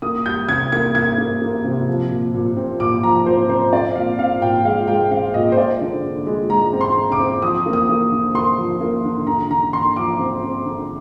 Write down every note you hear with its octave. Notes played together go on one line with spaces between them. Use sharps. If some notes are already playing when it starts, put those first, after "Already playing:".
A#3 D#6
G3 G6
C3 G#6
A#3 G#6
A#3 G#6
A#3
A#3
C3
F3
A#2
A#2
C4
A#2 D6
F3 A#5
A#2 C5
C4 C5
C4 D5
A#2 F5
C4 F5
A#2 G5
G#3 F5
G#3 G5
C4 F5
A#2 D#5
C5
G#3 D5
D3
D3
G#3
G#3 A#5
C4
C6
D3
D6
C4
F3 D#6
A#3
D#6
A#3
D3
A#3 C6
F3
A#3
D3
D3 A#5
D3 A#5
D3 C6
F3 D6
C4
C4
D3